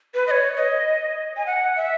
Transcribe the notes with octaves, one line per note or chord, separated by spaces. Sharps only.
B4
D#5
C#5
D#5
G#5
F#5
E5